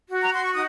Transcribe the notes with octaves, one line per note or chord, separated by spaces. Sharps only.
F#4
A#5
C6
C#6
D#4 D#6